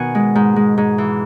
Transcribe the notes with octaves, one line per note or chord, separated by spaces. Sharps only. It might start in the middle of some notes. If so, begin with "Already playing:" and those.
Already playing: B2 D#3 F#5 G#5
G#3
G#2
G#3
G#2
E3